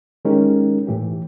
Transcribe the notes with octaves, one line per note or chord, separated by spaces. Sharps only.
D#3 G#3 C#4 D#4 G4 A#4
A2 E3 G4